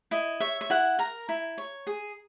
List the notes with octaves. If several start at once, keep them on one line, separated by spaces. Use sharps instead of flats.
E4 D#5
C#5 E5
E5
E4 F#5
A#4 A#5
E4
C#5
G#4